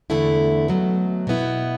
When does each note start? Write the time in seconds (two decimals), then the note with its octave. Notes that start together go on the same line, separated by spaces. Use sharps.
0.10 E2 D3 A3 E4
0.68 B2 F#3 A3
1.27 B2 B3 E4